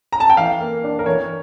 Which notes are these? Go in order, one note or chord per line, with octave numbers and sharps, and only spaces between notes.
A#5
A5
G5
E3 F5
A#3
D4
A#4
E3 C#5